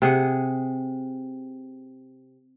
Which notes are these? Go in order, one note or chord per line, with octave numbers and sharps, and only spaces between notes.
C3 G#4 F#5